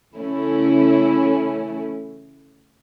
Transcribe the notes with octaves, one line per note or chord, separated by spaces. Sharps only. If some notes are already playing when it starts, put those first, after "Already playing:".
C#3 E3 A3 C#4 E4